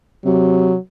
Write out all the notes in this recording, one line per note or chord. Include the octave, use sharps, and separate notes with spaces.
C3 F#3